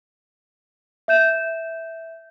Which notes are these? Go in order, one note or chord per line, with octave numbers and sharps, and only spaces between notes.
E5 G6 E7